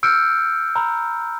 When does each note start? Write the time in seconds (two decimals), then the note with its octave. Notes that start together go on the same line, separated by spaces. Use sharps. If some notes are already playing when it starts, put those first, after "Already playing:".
0.03 E6 F6 G6 C#7 D7
0.76 A#5 B5